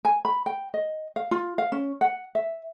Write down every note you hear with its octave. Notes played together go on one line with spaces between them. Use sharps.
G#5
B5
G5
D#5
F5
F4
F5
C#4
F#5
E5